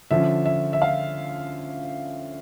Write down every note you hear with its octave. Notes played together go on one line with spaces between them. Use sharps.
D3 F3 C#4 E5
E5
E5
F5